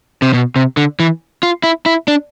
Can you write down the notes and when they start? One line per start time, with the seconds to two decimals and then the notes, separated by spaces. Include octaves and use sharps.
0.22 C3
0.34 B2
0.56 C3
0.77 D3
1.00 E3
1.43 F4
1.64 E4
1.86 E4
2.08 D4